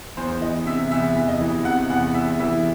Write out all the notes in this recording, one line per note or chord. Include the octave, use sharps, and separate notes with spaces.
E2 C5
E3 D#5
C3 E5
E2 E5
E2
D#5
E3
C3 F#5
E2 F#5
E2 E5
E3 E5